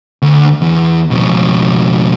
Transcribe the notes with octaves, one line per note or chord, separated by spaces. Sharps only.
D2
E2
F2 B2